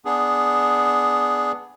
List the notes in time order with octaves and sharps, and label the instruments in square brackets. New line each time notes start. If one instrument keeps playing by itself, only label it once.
[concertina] B3 D4 G#4